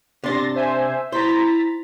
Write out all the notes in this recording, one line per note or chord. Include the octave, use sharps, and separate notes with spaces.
C3 D4 C6 A6 A#6
C5 E5 G#5
E4 C5 A#5 A6 B6